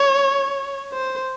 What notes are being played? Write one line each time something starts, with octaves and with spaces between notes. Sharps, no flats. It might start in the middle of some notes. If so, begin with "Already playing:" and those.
Already playing: C#5
C5